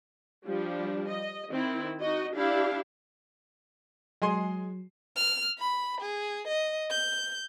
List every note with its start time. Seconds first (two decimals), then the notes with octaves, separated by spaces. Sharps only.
0.45 F3 G3 D4
1.08 D#5
1.49 D#3 C4 E4
2.01 D#4 F#4 D#5
2.33 D4 E4 G4 F5
4.22 F#3 G#3 G#4 G#5 C6
5.16 F6
5.59 B5
6.01 G#4
6.48 D#5
6.90 G6